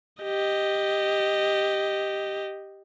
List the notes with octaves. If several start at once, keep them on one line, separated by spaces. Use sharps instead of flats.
G4 D#5